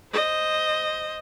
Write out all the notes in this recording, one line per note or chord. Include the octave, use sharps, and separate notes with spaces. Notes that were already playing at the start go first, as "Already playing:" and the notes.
C5 D#5